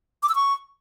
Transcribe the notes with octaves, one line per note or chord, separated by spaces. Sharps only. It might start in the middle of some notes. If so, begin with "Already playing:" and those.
D6
E6
C#6